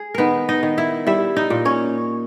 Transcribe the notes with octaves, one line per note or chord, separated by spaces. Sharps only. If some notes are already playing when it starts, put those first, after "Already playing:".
Already playing: G#4
D#3 B3 A#4 B4
D#4 D#5
D#3
E4 E5
G3 E4 E5
D#4 D#5
A#2
C#4 C#5